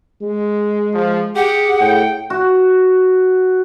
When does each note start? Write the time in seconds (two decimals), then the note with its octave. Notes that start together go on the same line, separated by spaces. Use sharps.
0.22 G#3
0.94 F3
1.36 G4 G#4 F#5
1.81 A2 G5
2.30 F#4